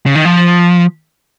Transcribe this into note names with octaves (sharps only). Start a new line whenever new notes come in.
C#3
D#3
F3